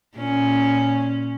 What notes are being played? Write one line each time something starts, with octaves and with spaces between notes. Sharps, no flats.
A#2 C#4